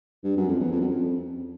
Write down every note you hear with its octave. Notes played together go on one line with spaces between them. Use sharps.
G2
F#2
F2
E2
F2
F#2
F2